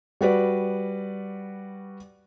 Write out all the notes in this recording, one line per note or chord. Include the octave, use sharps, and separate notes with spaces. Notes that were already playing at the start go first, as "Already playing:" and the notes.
G3 F#4 B4 D5